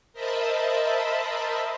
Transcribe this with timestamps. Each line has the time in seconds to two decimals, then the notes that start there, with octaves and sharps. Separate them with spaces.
0.13 A#4 C5 D#5 E5 A5 B5